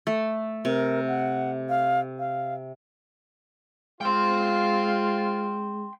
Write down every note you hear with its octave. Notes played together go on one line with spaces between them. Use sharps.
A3
C3 A#4
F#5
F5
F5
G#3 F4 G5 C6